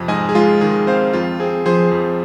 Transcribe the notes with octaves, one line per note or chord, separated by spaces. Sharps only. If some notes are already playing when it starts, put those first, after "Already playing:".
Already playing: F2 C3
G#2 D#5 G#5
G#4
G#3 F4
D#3 G#4
C4 C5 F5
F2 F4
C4 G#4
F3 G#4 C5
F2